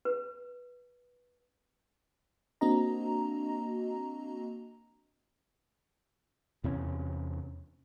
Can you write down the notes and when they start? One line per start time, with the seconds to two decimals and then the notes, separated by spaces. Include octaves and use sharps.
0.05 B4
2.61 A#3 C4 D4 F#4 D#5 A#5
6.64 E2 C3 C#4